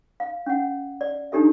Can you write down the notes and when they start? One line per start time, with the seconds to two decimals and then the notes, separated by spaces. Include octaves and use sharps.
0.20 F5
0.46 C#4 F#5
1.01 D5
1.32 D4 D#4 G4 A4 E5